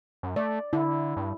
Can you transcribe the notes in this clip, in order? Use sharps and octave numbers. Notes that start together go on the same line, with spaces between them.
F#2
A3 D5
D3 E4
G2